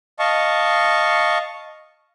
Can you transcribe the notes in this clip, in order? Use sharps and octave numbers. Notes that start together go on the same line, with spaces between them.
D#5 F5 A5 C#6